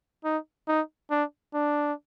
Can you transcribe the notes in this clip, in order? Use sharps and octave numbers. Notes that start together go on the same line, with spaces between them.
D#4
D#4
D4
D4